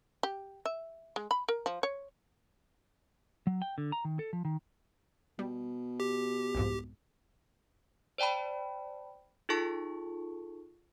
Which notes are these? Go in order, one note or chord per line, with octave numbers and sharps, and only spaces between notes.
G4
E5
G#3
B5
A#4
F3
C#5
F#3
G5
D3
A#5
D#3
A4
F3
D#3
B2 G3
G4
C2 F2 G#2
C5 D5 G5 A5 B5
D#4 F4 G#4 A4 A5 C#6